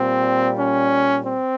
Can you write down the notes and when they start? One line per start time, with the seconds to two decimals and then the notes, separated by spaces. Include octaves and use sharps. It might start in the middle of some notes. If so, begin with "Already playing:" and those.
Already playing: A#2 G3 C4
0.57 C#4
1.24 C4